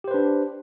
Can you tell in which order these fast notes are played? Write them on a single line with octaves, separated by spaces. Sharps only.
G4 C5 B4 D4